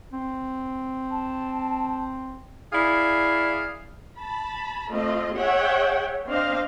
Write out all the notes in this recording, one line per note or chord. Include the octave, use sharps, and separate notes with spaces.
C4
A5
E4 G#4 D5 F5
A5 B5
A3 C4 F4 D#5
G#4 C#5 E5 F#5 G5
C4 D4 C5 D#5 F5